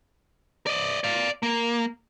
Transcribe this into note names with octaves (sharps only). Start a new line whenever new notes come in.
D5 D#5
D5 F5
A#3